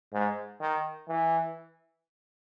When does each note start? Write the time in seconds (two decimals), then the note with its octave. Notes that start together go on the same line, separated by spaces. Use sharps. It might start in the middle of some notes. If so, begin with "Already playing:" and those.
0.13 G#2
0.61 D#3
1.09 E3